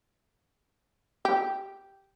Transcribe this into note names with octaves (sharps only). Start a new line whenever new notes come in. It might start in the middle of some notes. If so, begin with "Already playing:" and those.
G4